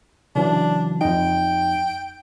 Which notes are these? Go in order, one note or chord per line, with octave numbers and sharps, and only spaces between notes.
C#3 E3 F#3 D4
F2 D#4 G5